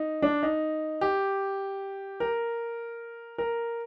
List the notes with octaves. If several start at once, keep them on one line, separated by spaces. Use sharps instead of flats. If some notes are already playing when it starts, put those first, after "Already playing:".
Already playing: D#4
D4
D#4
G4
A#4
A#4